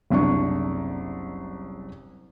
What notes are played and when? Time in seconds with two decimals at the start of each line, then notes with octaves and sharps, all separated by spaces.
0.10 F#1 C2 D4 C#6